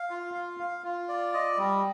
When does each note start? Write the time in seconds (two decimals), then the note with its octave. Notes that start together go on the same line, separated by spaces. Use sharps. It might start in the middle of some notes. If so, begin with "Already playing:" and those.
Already playing: F5
0.10 F4
0.34 F5
0.60 F5
0.84 F4
1.09 D5
1.34 D#5
1.58 G3